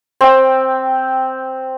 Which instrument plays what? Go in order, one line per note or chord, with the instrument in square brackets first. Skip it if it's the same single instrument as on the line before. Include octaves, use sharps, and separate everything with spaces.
[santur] C4 G5